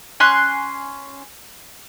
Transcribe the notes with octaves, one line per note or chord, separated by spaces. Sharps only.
C#4 G#5 C6 F#6